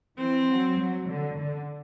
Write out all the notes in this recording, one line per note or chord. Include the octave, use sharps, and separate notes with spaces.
E3 C4
F#3
F#3
D3
D3